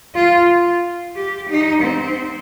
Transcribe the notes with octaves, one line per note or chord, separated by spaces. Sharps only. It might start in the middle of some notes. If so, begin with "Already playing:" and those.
F4
G4
D#4
C4